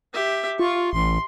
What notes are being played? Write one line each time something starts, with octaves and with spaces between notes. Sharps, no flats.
G4 E5
F4 C#6
A1 C6